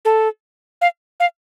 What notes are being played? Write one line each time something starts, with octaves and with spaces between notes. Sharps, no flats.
A4
F5
F5